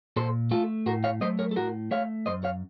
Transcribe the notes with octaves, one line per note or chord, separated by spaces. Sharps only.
A#2 A4 C5
A3 F4 A4
A2 F#4 A#4
C#5 F5
F#3 A3 C5 D#5
A#4 C#5
A4
A2 F#4 A#4
A3 C#5 F5
F#2 C5 D#5
C#5 F5